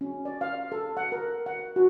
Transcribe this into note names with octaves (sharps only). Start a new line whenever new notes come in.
C#4
D5
F5
A4
F#5
A#4
F#5
F#4